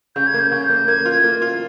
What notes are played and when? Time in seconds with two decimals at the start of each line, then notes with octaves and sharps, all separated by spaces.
0.16 C#3 G6
0.27 G#6
0.34 A#3
0.40 G6
0.51 C#3 G6
0.70 A#3
0.87 A#3 G#6
1.05 F4
1.24 A#3
1.42 F4